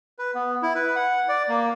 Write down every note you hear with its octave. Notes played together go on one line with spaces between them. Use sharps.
B4
B3
E4
B4
F#5
D5
A#3